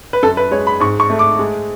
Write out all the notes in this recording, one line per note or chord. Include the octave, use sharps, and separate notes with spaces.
B4
F#2 A4
B4
G#3 C#5
B5
G#2 C#6
C#6
A3
D6
G#3